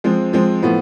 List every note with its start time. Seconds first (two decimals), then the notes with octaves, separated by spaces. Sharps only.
0.04 F3 G#3 C4
0.33 F3 G#3 C4
0.63 A2 F3 B3